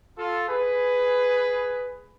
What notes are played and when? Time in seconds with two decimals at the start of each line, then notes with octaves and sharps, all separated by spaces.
0.19 F4 A4
0.49 G#4 B4